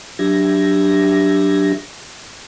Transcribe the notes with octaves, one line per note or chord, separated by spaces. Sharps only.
F#3 D4 G4 E5 G#6 A#6